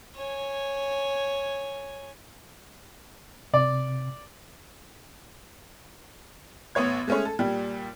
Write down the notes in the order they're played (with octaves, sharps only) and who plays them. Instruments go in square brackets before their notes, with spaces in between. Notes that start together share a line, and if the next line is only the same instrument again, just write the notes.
[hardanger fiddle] C#5 G#5
[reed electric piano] C3 [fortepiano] D5
[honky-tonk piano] A1 B3 C#5 G#6
G#3 A3 C#4 G#4 C#5
A4
A#2 G3